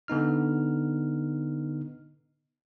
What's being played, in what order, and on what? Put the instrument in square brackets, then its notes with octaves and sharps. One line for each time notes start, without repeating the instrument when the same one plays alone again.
[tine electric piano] D3 B3 D#4 F6